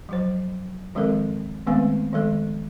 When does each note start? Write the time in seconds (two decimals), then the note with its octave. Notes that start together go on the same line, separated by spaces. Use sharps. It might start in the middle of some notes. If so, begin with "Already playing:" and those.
0.09 F3 F#3 C5
0.95 D#3 F3 G#3 C4 A4 A#4
1.67 D#3 G#3 A3 B3 C4 B4
2.13 D#3 F3 G#3 A4